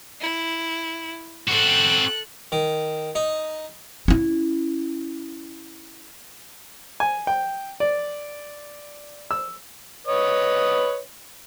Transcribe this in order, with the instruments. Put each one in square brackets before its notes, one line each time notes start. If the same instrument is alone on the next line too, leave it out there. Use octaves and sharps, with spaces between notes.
[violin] E4
[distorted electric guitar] C4 F#4 [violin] A4 F#6
[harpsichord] D#3
D#4
[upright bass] C#4 E4
[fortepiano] G#5
G5
D5
E6
[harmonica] B4 C#5 D#5